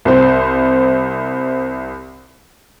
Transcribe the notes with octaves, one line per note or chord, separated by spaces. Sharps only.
C2 C5